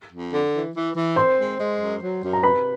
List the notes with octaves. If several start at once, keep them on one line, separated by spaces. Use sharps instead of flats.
F2
D3
E3
E3
E3
C4 C5 C6
G#3
G#3
F#2
F#3
F#2
A#5
C3 B4 B5